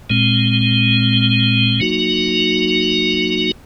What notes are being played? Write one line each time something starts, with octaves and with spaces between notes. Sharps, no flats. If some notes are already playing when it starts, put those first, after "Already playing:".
A#2 G#3 C4
F#3 A#3 D#4 F#4